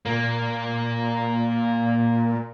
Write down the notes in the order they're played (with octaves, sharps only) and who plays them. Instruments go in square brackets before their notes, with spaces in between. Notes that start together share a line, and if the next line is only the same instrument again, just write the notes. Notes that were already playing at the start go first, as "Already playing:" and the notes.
[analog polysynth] A#2 [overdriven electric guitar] A#3